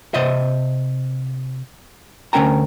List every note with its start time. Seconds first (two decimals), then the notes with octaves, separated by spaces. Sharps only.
0.14 C3 C5 D#5 E5
2.33 D2 E3 C#4 A#4 G5 A#5